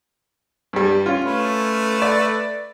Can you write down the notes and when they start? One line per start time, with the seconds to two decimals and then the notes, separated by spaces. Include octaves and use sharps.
0.73 G2 G3
1.06 C#4 F4
1.25 A3 B4
2.02 D5